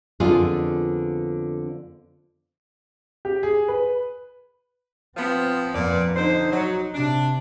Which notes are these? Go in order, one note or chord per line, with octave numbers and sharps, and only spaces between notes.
F2 D3 B3 D4 F4 G#4
G4
G#4
B4
F3 B3 C4
F2 A#2 B3 D5
D3 D#4 C5
F#3
C3 D4